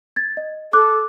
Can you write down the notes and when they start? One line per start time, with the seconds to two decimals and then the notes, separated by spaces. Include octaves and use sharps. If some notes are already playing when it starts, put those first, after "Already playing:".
0.16 G#6 A6
0.37 D#5
0.73 A4 D6 F#6